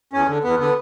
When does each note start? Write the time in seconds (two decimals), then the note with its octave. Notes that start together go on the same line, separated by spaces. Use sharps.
0.13 E2 C#4
0.28 D3
0.44 E2 B3
0.60 D3 B3